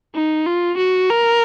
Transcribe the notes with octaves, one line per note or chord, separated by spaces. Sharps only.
D#4
F4
F#4
A#4